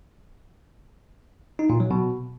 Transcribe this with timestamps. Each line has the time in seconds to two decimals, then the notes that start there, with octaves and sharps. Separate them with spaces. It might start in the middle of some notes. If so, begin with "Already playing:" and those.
1.59 D#4
1.70 A#2
1.80 F#3
1.91 B2